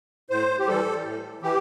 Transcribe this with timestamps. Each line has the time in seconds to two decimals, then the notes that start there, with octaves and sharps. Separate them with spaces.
0.30 A2 C5
0.59 G4
0.68 E3 G3 A4
1.05 A2
1.42 E3 G4